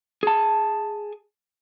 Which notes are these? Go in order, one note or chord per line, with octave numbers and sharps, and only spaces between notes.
G#4 A5